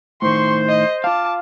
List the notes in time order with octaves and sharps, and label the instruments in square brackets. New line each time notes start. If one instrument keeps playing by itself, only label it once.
[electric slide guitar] A2 D#3 [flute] C5 [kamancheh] C6 C#6
[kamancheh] D#5
[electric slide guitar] F4 F5 [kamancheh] A5 D6